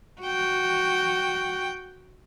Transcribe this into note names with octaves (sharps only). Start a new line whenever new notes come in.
F#4 G5